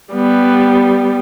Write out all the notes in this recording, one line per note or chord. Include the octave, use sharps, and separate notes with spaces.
G3 B3